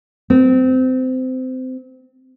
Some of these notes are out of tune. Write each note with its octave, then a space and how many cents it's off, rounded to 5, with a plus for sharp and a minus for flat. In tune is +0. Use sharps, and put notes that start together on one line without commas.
C4 -25